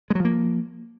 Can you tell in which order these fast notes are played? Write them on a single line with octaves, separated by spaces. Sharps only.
G#3 F#3 F3 A#3